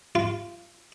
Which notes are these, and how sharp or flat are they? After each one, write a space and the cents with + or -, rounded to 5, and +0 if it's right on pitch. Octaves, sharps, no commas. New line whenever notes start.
F4 -20